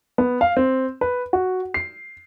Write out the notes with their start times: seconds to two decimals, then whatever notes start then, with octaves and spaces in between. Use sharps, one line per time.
0.18 B3
0.41 F5
0.57 C4
1.01 B4
1.33 F#4
1.74 C7